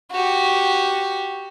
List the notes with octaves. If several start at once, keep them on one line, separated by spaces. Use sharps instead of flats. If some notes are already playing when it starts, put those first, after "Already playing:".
F#4 G4